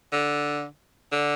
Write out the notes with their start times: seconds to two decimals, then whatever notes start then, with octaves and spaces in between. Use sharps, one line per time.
0.12 D3
1.12 D3